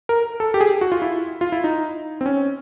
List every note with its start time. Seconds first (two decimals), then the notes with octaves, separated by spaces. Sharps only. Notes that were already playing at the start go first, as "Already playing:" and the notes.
0.09 A#4
0.40 A4
0.54 G4
0.61 G#4
0.81 F#4
0.92 F4
1.02 E4
1.41 F4
1.52 E4
1.64 D#4
2.21 C4
2.26 C#4